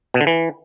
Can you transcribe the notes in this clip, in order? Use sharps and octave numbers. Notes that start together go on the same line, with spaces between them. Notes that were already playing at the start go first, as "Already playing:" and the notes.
B2
D3
E3